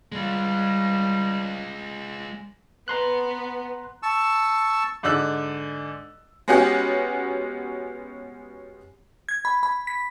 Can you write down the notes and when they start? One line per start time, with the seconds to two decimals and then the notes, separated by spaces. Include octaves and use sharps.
0.12 G3 G#3 F4
2.88 B3 A#5 C6 F#6
4.03 A5 C#6 E6
5.03 G#2 D3 D5 E6 F#6
6.48 G#3 B3 C#4 F#4 G4
9.29 G#6
9.45 B5
9.63 B5
9.87 B6